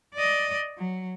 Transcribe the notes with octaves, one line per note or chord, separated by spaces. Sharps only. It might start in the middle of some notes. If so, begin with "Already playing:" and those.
D5 D#5
F#3